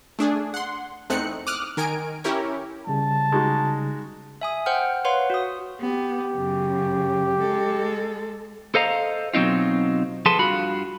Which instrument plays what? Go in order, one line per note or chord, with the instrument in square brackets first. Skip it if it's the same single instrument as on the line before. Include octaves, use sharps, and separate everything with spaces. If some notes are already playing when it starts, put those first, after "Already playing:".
[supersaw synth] A3 D4 G#4
F#5 C6
E2 A3 C4 D#4 F#6 C#7
D6 D#6 F6 F#6
D#3 A#4 G#5 D7
C#4 E4 G4 A#4 C#5
[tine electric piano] C#3 G3 [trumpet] A5
[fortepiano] G#3 D#4 F#4
[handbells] E5 G#5 D#6
C5 F#5 G5 F6
B4 C#5 F5 F#5 C6
F#4 D#6
[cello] B3 [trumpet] G4
[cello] F#2 C#3
G#3 A4
[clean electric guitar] A4 C5 D#5 F5 A#5
B2 F#3 C4 D#4 F4
F3 G#4 A4 B4 A5 C6
G2 F4 F#4 B5